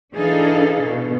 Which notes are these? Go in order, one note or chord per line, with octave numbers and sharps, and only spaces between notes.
E3 D4 D#4 G#4 A4 F5
B2